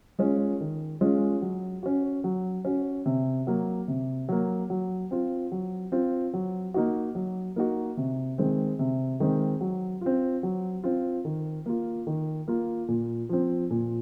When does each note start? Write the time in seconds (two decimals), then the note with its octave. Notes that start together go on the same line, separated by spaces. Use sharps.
0.19 G#3 C#4 F4
0.61 D#3
1.01 G#3 C#4 F4
1.42 F#3
1.83 C#4 F#4
2.24 F#3
2.65 C#4 F#4
3.06 C3
3.47 F#3 A#3
3.88 C3
4.29 F#3 A#3
4.70 F#3
5.11 C4 F4
5.52 F#3
5.92 C4 F4
6.34 F#3
6.74 A#3 D#4 F#4
7.15 F#3
7.56 A#3 D#4 F#4
7.97 C3
8.38 D#3 G#3 C4
8.79 C3
9.20 D#3 G#3 C4
9.61 F#3
10.01 C4 F4
10.43 F#3
10.84 C4 F4
11.25 D#3
11.66 A#3 F4
12.07 D#3
12.48 A#3 F4
12.88 A#2
13.29 F3 C4
13.71 A#2